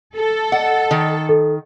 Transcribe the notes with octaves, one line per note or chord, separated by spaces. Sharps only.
A4
D#5 F#5
D#3
A4